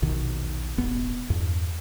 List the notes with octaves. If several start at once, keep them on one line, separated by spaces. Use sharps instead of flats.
A#1 D#2 B2 D#3
D#1 G#1 B3
E2 G2